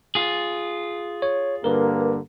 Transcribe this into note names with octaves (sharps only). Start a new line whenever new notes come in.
F4 G#4
C#5
G2 D3 A#3 A#4 B4